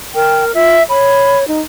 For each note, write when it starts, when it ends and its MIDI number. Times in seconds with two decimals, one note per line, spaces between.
0.14 0.51 70
0.14 0.44 79
0.54 0.76 65
0.54 0.83 76
0.89 1.46 73
0.89 1.38 83
1.48 1.60 63